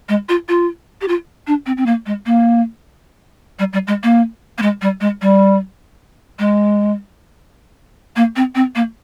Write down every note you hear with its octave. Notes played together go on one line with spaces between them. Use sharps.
G#3
F4
F4
G4
F4
D4
C4
C4
A#3
G#3
A#3
G3
G3
G#3
A#3
A#3
G#3
G3
G#3
G3
G#3
A#3
C4
C4
A#3